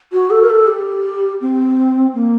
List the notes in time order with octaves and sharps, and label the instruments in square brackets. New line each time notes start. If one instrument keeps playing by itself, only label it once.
[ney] F#4
A4
A#4
A4
G4
C4
A#3